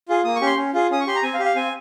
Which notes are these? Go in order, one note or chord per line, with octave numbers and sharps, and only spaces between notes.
F4 G#4
A#3 D#6
C#6
C#4 G4
C6
C#4
F4 G#4
C#4 D#6
C#6
G4 C6
A#5
C4 G#5
F5
G4
F5
C4 G#5